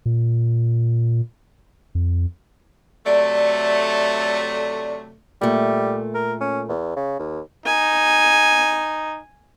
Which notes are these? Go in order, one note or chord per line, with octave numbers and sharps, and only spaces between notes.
A#2
F2
C3 F#3 A3 D5
A#2 G3 A3
A#4
C#4
E2
C#3
D#2
D#4 G#5